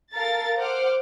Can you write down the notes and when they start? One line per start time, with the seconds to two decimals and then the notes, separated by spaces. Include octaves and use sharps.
0.13 A4 A#4 F5 A#5 A6
0.59 C5 F#5 D6 F6